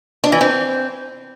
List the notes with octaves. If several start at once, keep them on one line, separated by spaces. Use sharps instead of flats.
D4
E3
C4